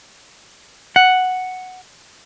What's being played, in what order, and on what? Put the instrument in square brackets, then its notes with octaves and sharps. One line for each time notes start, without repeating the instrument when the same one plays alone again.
[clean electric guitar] F#5